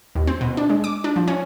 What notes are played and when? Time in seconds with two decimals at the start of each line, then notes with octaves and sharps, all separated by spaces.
0.15 D#2
0.27 C4
0.41 B2
0.57 D4
0.69 G#3
0.84 D6
1.04 D4
1.16 F3
1.28 C#4